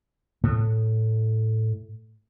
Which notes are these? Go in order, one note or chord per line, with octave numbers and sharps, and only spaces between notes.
A2 A3